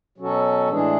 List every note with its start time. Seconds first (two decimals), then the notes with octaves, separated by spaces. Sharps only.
0.18 B2 F#3 C#4 F#4 A4
0.69 A2 E3 G#3 D4 G#4